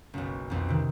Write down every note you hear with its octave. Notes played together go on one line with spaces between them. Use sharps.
F#1 B1
B1 F2
C3 D#3